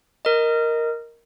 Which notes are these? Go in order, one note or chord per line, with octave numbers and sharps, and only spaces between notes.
A#4 D#5